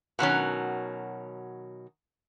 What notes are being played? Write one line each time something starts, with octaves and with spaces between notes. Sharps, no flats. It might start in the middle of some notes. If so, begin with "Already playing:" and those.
B2 D#3 F#3 C#4